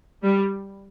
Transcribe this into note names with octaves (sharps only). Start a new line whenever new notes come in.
G3